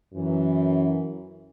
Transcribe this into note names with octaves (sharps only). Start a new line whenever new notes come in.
F#2 E3